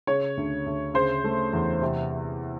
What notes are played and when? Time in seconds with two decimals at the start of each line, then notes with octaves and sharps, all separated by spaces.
0.07 C#3 C#5
0.37 D2
0.66 D2
0.94 C#3 C5
1.24 A3
1.53 E2
1.82 C3